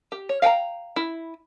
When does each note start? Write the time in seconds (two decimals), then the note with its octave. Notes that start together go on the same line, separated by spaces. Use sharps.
0.12 G4
0.29 C#5
0.42 F5 G5 G#5 A#5
0.96 E4